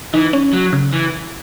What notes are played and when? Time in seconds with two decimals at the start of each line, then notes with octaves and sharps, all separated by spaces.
0.14 E3 D#4
0.33 C#4
0.53 F#3
0.73 C#3
0.93 E3